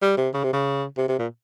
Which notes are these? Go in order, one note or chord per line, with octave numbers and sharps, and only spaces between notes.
G3
C3
C#3
C3
C#3
C3
C3
A#2